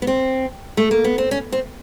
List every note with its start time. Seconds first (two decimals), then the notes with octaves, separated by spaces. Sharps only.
0.02 B3
0.07 C4
0.77 A3
0.91 A#3
1.04 B3
1.18 C4
1.31 C#4
1.52 C4